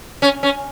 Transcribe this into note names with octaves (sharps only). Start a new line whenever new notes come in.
C#4
C#4